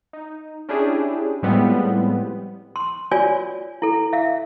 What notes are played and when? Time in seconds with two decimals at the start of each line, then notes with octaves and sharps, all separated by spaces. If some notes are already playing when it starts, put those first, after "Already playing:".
0.13 D#4
0.69 C#4 D4 E4 G4 G#4
1.43 A2 F3 G3 G#3 B3 C4
2.76 C6
3.11 F4 F#4 C#5 D5 G#5
3.82 E4 A4
4.13 E5 F5